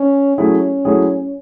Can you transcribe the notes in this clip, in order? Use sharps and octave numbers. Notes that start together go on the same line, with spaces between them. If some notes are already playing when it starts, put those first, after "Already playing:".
Already playing: C#4
F#3 A3 C#4 E4 G#4
F#3 A3 E4 G#4